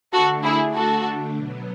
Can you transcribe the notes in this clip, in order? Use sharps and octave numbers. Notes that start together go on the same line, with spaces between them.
D3 A3 D4 F#4 A4
E4 G#4
F#4 A4
B2 F#3 B3